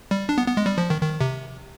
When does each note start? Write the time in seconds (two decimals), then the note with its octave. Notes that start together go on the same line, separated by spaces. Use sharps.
0.11 G3
0.29 D4
0.38 B3
0.48 B3
0.57 G#3
0.66 G3
0.78 F3
0.90 D#3
1.02 D#3
1.21 C3